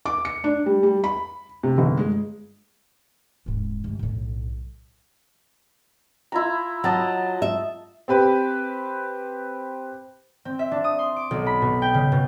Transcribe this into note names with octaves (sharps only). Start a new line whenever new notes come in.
D6
C#7
D4
G3
G3
B5
C3
G1
G#3
D#1 G#2
G1 A3
B1 A2
E4 F4 A#5
F#3 D#5 A5 A#5
E5
C4 G4 B4
C4
E5
D4
D#6
C6
D6
B1
B5
B2
G5
C#3
B2